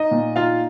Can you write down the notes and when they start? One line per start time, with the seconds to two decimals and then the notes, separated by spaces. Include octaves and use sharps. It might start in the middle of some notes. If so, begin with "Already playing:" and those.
Already playing: D#4 D#5
0.11 A#2
0.36 D#4 F4 F5